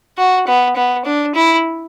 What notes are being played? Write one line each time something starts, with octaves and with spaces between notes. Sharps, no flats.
F#4
B3
B3
D4
E4